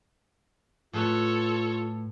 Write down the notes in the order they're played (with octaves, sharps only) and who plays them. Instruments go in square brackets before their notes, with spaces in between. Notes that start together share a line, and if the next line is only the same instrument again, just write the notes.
[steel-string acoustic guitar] A2 B4 A5 [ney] F4 [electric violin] A4 C#5